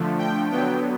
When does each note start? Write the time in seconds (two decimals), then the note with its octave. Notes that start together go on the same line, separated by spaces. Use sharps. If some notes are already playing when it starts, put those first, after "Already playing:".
Already playing: D3 F3 A3
0.18 G5
0.50 D3 F#3 B3 G5